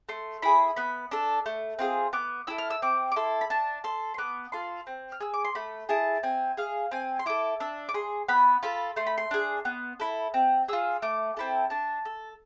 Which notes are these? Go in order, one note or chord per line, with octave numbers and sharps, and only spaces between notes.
A3 C6
E4 G#4 B5
B3 B5
D4 A4
A3
C4 F4 G#4
B3 D6
E4 A4 E6
F6
E6
C4 D6
D6
E4 A4 C6
B5
D4 A5
A4 C6
C6
B3 D6
F4 A4 C6
C4
F6
G#4 E6
D6
C6
A3 B5
E4 G#4 A5
C4 G#5
G#4 F5
C4 G#5
C6
E4 A4 D6
D4 E6
D6
G#4 C6
B3 B5
F4 A4 B5
A3 C6
B5
C6
D4 G#4
B3
E4 A4
C4
F4 G#4 E6
A3 D6
C4 E4 A4 A5
D4 A5
A4